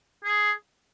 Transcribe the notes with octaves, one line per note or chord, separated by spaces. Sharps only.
G#4